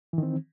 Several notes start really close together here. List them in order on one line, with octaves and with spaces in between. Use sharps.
E3 D#3 C4